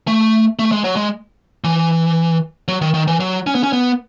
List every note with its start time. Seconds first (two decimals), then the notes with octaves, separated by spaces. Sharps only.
0.08 A3
0.59 A3
0.72 G#3
0.84 F#3
0.96 G#3
1.64 E3
2.68 F#3
2.81 D#3
2.94 D#3
3.08 E3
3.20 F#3
3.47 C#4
3.55 B3
3.63 C#4
3.73 B3